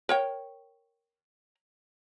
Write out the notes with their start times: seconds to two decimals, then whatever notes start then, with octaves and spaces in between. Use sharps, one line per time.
0.09 A#4 C#5 G5